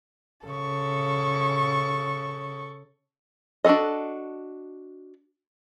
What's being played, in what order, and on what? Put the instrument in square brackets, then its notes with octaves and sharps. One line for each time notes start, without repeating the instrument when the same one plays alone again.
[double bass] C#3 [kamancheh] A4 C#6
[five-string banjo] D4 F#4 G#4 A4 D#5